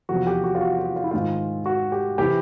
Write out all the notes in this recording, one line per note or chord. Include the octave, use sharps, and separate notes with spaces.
E2 C3 F3 F#4
G4
F#4
F4
F#4
F4
F4
E4
G#2 D#3 F4
F#4
G4
C3 E3 G4